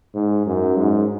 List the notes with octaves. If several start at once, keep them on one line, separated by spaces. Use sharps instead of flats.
G#2
F#2
G#2